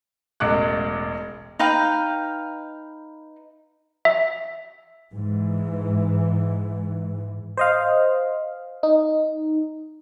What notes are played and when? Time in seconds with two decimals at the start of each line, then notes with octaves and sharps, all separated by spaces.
0.40 E1 A1 D6 F#6
1.59 D#4 B4 F5 G5
4.05 E5
5.14 G#2 E3
7.57 C5 D#5 F5
8.83 D#4